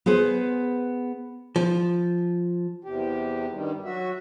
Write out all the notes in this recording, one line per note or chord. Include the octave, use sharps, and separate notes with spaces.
B3 G#4 B4 C5
F3
E2 C3 G4
G2 D#3 G3
F#3 F#4 E5